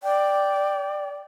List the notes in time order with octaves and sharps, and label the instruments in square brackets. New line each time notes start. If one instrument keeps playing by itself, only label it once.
[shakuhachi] D5 [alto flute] G5